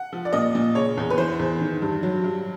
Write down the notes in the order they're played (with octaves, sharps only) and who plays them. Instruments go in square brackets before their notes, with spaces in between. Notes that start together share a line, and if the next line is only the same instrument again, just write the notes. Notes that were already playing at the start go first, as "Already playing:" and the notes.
Already playing: [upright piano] F#5
F3
D5
A#2 D#5
A#2
C#3 C#5
E2
B4
E3 C5
E2
D#3
G2
F#3
G2